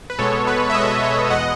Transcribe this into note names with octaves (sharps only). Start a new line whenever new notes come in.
B4
B2 G#3 B3 A4 C#5
B4
E5
B2 G#3 B3 B4 D#5
C#5 E5
E2 B2 G#3 B3 D#5 F#5